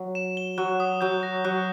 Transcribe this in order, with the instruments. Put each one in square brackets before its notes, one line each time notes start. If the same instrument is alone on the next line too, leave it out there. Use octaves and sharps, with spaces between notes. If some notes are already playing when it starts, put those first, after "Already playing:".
Already playing: [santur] F#3
[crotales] E7
G7
[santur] F#3 [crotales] F#6
[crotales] D#6
[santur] F#3 [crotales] G6
[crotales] A#6
[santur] F#3 [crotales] F#6